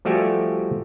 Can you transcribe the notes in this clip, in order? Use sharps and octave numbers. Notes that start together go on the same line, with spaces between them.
F3 G3 A3 F#4 G4 G#5